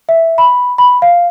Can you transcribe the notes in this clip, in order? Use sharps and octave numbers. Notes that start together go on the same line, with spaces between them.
E5
B5
B5
F5